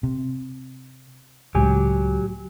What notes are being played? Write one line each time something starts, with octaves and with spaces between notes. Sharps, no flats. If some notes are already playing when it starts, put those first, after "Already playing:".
C3
C#2 A2 F#3 G#3 G4 G#5